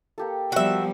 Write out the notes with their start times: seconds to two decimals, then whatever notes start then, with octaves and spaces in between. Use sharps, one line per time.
0.18 A#3 G4 A4
0.52 F3 G3 B3 F#4 E5